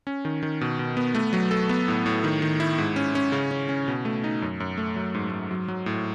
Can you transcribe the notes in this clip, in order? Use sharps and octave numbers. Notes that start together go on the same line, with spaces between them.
C#4
D#3
D#3
B2
B2
B3
A3
F#3
A4
B3
A2
A2
D#3
D#3
E4
G#2
C#4
C#4
C#3
C#4
C#4
B2
A3
D#4
F#2
F#2
A3
F#3
G#2
G#2
F#3
F#3
A2